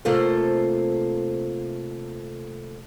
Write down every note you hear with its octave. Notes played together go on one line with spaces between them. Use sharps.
C3 A3 A#3 F4 A4 C5